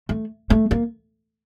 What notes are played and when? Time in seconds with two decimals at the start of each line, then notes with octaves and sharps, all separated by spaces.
0.09 A3
0.50 A3
0.71 A#3